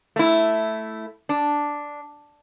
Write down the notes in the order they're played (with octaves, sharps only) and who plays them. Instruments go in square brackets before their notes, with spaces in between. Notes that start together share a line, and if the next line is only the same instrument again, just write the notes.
[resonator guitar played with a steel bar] A3 E4
D4